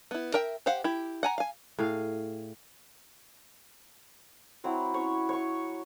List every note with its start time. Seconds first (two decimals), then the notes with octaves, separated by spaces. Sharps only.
0.11 B3 E4
0.34 A#4 E5 G5
0.66 G4 C5 F5 F#5
0.84 E4 G4
1.23 F#5 G#5 A#5
1.38 F5 G#5
1.79 A2 G#4 F5
4.64 F#3 C4 E4
4.94 C#4 C#5
5.29 C#5 C#6